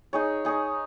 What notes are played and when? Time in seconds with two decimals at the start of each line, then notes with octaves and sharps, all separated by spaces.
0.13 D#4 G#4 C#5
0.45 D#4 G#4 C#5